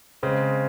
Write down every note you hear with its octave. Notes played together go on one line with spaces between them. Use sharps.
C#3 G#3 C4